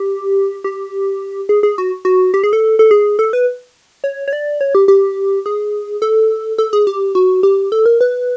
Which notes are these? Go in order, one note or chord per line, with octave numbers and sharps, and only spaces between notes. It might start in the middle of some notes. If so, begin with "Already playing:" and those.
Already playing: G4
G4
G#4
G#4
F#4
F#4
G4
G#4
A4
A4
G#4
A4
B4
C#5
C#5
D5
C#5
G4
G4
G#4
A4
A4
G#4
G4
F#4
G4
A4
A#4
B4